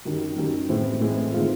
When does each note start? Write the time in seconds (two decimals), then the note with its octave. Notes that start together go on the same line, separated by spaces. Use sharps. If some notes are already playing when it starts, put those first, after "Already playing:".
0.05 F#2 D#3 G3
0.36 F#2 D#3 G3
0.69 A2 E3 G#3 C4 E4
1.00 A2 E3 G#3 C4 E4
1.33 D#3 G#3 C4 F4